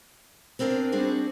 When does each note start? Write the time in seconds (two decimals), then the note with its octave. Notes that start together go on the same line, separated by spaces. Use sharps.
0.59 B3 C4 D4 A#4 F5
0.92 G3 C4 D4 F#4 G#4 A4